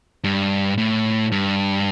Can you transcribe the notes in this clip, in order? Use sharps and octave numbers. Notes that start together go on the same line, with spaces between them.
G2
A2
G2